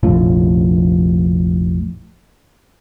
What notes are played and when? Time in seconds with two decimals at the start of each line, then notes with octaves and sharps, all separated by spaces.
0.03 F1 A#1 A2 F3